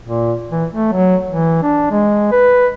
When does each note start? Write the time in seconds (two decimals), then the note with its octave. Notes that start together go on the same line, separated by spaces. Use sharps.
0.03 A#2
0.50 E3
0.73 A3
0.93 F#3
1.28 E3
1.63 D4
1.91 G#3
2.32 B4